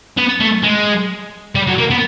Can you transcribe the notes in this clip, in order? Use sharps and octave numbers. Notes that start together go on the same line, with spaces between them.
B3
A3
G#3
G3
F#3
A#3
B3